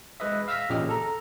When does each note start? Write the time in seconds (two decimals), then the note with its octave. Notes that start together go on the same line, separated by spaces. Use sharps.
0.20 G#3 B4 D#5 E5
0.48 F5 E6 F6 A#6 B6
0.69 A1 A#2 C#3 G4 D#5 F6
0.89 A4 A#5